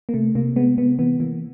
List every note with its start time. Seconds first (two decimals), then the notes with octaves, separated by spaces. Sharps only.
0.09 A#3
0.14 C3 A3
0.35 C3 A#3
0.56 G#3 B3
0.77 C3 B3
0.99 E3 B3
1.20 E3 A#3